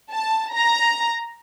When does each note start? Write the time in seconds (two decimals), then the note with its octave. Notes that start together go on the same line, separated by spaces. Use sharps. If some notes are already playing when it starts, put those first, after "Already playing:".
0.12 A5
0.53 A#5